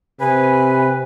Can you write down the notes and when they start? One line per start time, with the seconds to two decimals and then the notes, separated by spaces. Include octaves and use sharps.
0.20 C3 B4 G#5